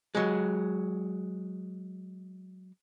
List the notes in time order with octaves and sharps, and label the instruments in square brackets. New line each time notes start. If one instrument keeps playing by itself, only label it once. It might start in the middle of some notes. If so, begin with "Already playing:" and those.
[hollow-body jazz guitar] F#3 G#3